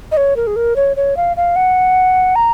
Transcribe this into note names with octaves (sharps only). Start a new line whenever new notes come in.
D#5
C#5
A#4
G#4
A#4
C#5
C#5
F5
F5
F#5
A#5